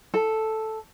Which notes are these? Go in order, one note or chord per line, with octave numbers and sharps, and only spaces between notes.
A4